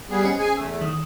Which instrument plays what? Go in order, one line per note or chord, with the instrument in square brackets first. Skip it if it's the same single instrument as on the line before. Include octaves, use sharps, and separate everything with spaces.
[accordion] G3 B3 G#4
[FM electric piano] C#4 C5 D#5
[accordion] G#4 G#5
[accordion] E2 A3 [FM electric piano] E6
[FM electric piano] D#3 D#6